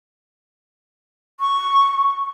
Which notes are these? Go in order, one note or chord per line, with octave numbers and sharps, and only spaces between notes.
C#6